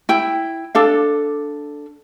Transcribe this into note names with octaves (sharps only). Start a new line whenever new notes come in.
E4 G5
D4 A4 F5